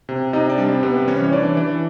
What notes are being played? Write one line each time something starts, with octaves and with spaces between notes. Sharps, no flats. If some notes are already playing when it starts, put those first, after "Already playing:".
C3
C3 D#4 D#5
D4 D5
G3
C4 C5
C3 B3 B4
E3 C#4 C#5
C#5
E3 D4 D5
E3